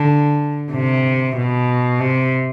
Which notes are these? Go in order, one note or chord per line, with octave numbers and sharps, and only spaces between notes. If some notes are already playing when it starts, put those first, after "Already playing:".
Already playing: D3
C3
B2
C3